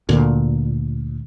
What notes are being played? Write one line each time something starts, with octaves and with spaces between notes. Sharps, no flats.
D2 A#2